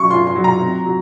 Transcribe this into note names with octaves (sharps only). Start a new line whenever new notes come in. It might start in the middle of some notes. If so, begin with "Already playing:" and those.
Already playing: F#3 C#4 C#6
F4 C6
C6
F#3
A#5
C4
F#3